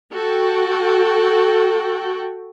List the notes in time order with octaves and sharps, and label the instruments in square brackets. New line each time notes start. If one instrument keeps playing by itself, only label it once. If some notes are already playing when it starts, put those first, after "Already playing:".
[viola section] F#4 A4 G5